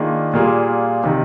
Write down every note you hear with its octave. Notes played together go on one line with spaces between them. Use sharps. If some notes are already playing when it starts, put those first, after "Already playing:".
Already playing: D#3 A#3 D4 F4 G#4
A#2 G3 A#3 F4 G#4
C3 D#3